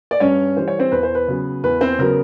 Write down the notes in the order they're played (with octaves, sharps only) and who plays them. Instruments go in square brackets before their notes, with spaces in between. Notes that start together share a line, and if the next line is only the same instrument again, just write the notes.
[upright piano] D5
G2 C#4 C#5
E3 G3 C5
C#5
C4 C5
E2 B4
C5
B4
C#3 F#3 B3
E2 B4
C4 C5
C#3 F#3 B3 A#4